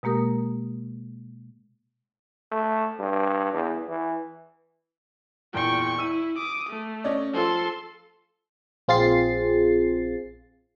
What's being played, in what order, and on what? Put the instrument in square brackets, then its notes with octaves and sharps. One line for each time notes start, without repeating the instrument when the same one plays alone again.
[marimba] B2 G#3 A#3 G4 A#4 D#6
[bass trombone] A3
G2
E2
E3
[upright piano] E2 A#2 [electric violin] G5 C#6
[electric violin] E4 [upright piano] E6 D#7
[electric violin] D6 D#6
A3
[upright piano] C#4 D5 D#5
[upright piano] F3 F4 [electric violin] A4 C6
[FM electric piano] A#1 C4 F4 G#4 A6 C7